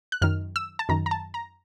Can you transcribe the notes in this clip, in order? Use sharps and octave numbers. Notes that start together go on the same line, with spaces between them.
F#6
F#2 D#3 F6
E6
A5
F#2 D#3 A#5
A#5
A5
A#5